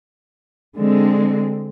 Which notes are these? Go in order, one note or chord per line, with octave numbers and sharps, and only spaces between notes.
D3 G#3 C4